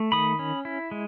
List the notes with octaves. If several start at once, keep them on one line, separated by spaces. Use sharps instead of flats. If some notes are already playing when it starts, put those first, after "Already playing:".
Already playing: A3
D#3 B5 D#6
C#4
E4
G#3